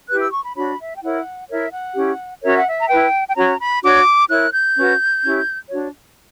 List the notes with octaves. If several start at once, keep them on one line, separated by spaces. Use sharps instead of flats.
E4 G4 B4 F#6
E6
C#6
B5
D4 F#4 C#5 B5
E5
G5
E4 A#4 C#5 F#5
E4 A#4 C#5 E5
F#5
C#4 E4 G4
C#4 F#4 A#4 C#5 E5
F#5
E5
A#5
E4 B4 G5
G5
C#4 F#4 C#5 A#5
B5
D4 F#4 C#5 D6
E4 A#4 C#5 F#6
G6
C#4 F#4 B4
C#4 E4 G4 C#5
D4 F#4 C#5